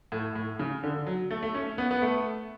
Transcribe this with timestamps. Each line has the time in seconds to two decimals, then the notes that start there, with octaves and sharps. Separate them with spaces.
0.12 A2
0.35 A2
0.59 C#3
0.83 D3
1.07 F#3
1.31 A3
1.43 A3
1.54 C#4
1.78 B3
1.91 B3
2.02 A3